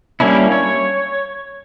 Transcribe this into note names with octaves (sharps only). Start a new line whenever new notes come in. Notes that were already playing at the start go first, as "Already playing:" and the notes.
G3 A#3 C#4 D4 E4
C#5